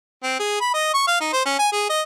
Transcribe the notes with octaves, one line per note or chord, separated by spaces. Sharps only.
C4
G#4
B5
D#5
C#6
F5
D#4
C5
C#4
G#5
G#4
D#5